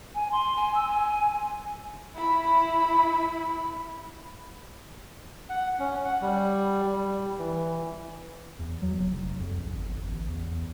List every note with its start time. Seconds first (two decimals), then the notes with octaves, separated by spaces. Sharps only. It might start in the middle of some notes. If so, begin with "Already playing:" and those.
0.15 G#5
0.32 C6
0.56 G#5
0.75 E6
0.88 G#5
2.14 E4 B5
5.49 F#5
5.79 C#4
6.05 F#5
6.22 G3
6.87 G3
7.39 E3
8.59 E2
8.82 F#3
8.97 F#1
9.12 F1
9.40 F2
9.57 A#1
9.71 G1
10.06 A1
10.27 E2